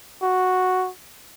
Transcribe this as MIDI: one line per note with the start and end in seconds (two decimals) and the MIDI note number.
0.23 0.90 66